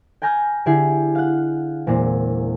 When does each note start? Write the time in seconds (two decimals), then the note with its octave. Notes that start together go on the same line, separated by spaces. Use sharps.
0.22 G5 G#5 A#5 F6 G6
0.66 D3 E4 G4 G#4
1.15 F5 F#5
1.87 E1 A#2 C4